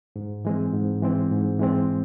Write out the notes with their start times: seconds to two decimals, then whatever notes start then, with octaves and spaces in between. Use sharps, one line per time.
0.16 G#2
0.45 E3 G#3 C4
0.74 G#2
1.02 E3 G#3 C4
1.31 G#2
1.59 E3 G#3 C4